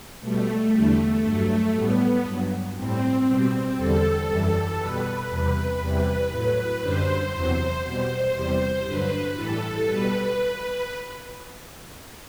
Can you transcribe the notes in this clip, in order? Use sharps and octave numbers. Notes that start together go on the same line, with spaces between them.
B2 G3 A3
E2 D3 G3
G2 F#3 A3
A2 G3 B3
G2 F#3
A2 G3 C4
B2 G3
E2 D3 G3 A4
F#2 E3 G3
B2 G3 B4
E2 C3 G3
E2 C3 E3 G3
A2 F#3
F#2 D3 G3 C5
E2 C3 F#3
B2 G3 C5
E2 C3 G3
G2 D3 F#3 B4
A2 E3 G3 A4
B2 G3 B4